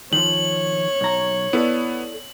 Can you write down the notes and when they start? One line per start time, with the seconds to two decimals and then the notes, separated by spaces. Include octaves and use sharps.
0.13 D#3 F3 C#5 F#7
1.01 B1 A#5
1.53 B3 E4 A4 D5